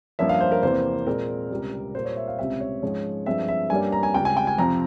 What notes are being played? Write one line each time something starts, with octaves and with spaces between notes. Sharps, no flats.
G2 F3 A#3 C#4 E5
F5
C5
A#4
E2 C3 E3 A#3 C5
A#2 G#3 C4 A#4
C#2 C3 G3
A#2 G3 A#3 C5
C#5
E5
F5
C#2 C3 G3 C4 E5
C#5
G#2 F3 G#3 C#4
G2 F3 G#3 C4 E5
E5
G2 G3 A#3 C#4 G#5
A#5
G#5
C#2 C#3 G3 G5
G#5
G5
G#5
F2 C3 F3 C4 A#5